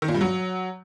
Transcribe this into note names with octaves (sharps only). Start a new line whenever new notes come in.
D#3
A#2
G2
F#3